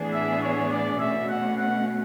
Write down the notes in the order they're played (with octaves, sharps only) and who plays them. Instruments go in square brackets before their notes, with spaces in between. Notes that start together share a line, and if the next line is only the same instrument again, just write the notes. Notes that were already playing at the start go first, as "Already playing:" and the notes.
Already playing: [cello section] A2 E3 B3 D4 G#4
[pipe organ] E5
C#5
D5
[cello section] B2 A3 C#4 [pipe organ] E5
[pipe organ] F#5
F#5